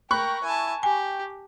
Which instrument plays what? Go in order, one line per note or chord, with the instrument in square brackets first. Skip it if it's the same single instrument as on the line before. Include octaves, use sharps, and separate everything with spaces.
[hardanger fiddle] A#4 [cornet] G5 [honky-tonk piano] B5 C#6 F#6
[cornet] E4 [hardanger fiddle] G#5 A5
[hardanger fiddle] G4 [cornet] G5 [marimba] G#5